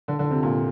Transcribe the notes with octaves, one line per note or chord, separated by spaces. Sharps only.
D3
D3
C3
A#2